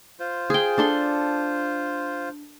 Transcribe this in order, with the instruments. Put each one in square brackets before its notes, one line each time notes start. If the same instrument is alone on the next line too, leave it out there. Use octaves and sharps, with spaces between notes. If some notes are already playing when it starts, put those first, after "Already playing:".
[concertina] F4 C5
[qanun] G#4 G5
D4 A4 C6